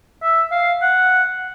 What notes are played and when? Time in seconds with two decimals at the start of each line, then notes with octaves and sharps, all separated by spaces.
0.23 E5
0.51 F5
0.82 F#5